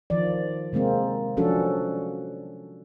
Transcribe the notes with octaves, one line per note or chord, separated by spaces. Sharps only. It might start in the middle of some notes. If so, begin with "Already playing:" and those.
D#3 F3 D5
C3 G#3 A#3 C4
F3 F#3 C#4 D4 F#4 A4